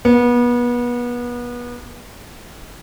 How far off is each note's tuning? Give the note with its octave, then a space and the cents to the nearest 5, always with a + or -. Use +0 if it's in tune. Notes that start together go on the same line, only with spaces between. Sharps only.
B3 -30